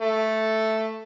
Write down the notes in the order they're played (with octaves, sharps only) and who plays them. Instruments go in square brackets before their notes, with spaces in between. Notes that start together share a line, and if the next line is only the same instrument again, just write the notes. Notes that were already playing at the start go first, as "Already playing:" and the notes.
[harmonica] A3